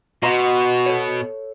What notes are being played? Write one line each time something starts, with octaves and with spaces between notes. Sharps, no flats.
B2 F#4 D#5 A#5 C6
A4 C#5